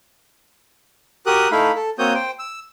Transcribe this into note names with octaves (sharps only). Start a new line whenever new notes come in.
F#4 G4 A#4 D#6 F#6
A3 D#4 E4 F5 B5
A4
A#3 C4 F#4 C#5 D#6 G6
C5 G5
E6